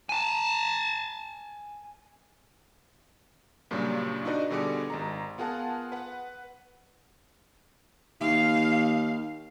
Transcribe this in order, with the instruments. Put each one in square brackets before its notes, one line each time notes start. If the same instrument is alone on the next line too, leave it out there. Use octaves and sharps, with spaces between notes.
[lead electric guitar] G#5 A5
[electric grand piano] G2 A#2 C#3 F#3 G3
D4 D#4 F#4 B4 D5 D#5
B2 D3 G3 G#4 D6 C#7
G#1 G#3 A#5
B3 F4 G#4 A#4 F#5 A5
B4 F#5
[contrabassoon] D#2 [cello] F5